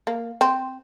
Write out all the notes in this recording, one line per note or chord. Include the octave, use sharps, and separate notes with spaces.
A#3
C4